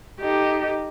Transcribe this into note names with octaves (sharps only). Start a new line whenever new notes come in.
D#4 G4 A4 D#5